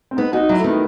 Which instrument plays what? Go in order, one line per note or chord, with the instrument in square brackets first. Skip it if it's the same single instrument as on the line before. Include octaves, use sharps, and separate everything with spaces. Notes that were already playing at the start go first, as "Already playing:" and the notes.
[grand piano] C4
[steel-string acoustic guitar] B3 [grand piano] D#4
[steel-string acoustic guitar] D#4 [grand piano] F#4
[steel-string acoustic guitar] F#3 [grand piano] E4
[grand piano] A3
[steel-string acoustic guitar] D#3 [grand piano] B3